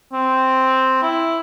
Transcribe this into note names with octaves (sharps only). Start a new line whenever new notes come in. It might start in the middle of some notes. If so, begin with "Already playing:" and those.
C4
E4